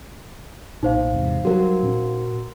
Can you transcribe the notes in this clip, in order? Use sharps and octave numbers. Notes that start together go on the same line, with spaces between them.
B1 A#2 D#4 C5 F5
E2 G#2 C3
F#3 G3 F#4 A#4
A#2 C#4